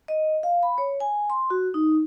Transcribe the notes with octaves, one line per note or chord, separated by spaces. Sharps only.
D#5
F5
B5
C#5
G#5
C6
F#4
D#4